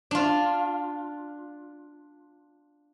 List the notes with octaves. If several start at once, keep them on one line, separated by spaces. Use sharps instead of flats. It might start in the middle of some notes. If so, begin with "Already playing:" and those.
D4 F4